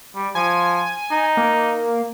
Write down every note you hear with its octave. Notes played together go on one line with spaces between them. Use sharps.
G3
F3 G#5
D#4
A#3